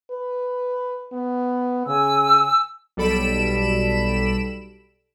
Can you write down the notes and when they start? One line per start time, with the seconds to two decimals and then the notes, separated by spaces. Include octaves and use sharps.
0.11 B4
1.13 B3
1.87 C#3 G#5 E6
2.97 B1 G3 A4 B5 D7 E7